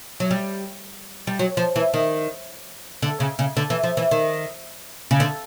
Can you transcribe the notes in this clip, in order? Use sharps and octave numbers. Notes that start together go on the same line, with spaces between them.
F#3
G3
G3
F#3
F3
E3
D#3
D3
C#3
C#3
D3
E3
F3
E3
D#3
C#3
D3